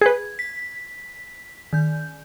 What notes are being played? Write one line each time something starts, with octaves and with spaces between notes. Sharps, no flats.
G#4 B4 G#6
B6
D#3 G6